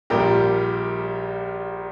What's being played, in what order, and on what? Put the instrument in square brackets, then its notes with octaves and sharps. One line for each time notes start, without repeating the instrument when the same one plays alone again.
[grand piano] A#1 A#2 G3 G4 A#4